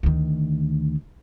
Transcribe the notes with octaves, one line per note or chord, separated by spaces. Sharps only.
D2 D#3